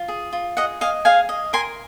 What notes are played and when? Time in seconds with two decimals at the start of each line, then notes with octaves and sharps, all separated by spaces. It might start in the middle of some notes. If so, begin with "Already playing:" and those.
Already playing: F4
0.08 G#4
0.33 F4
0.57 G#4 D#5 F#5
0.81 D#5 F5 G#5
1.05 G#4 F5 G#5
1.29 D#5
1.53 A#4 G#5 C6